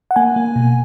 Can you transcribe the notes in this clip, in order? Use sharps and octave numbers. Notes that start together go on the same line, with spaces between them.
F#5
A#3 G#5
A#3
B2